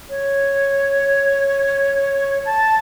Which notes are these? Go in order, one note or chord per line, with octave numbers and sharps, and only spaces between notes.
C#5
A5